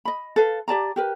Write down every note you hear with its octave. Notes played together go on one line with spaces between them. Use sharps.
D#5 B5
A4 B4 F5
G4 D5 A5 A#5
G4 A#4 B4